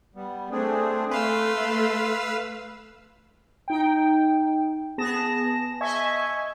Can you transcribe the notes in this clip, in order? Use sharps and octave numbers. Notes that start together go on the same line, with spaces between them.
G3 B3
A3 C4 D4 G#4
A3 B4 F5 C6 E6
D#4 G5
B3 G#4 A5 A#6 E7
D#5 E5 G#5 C#6 G#6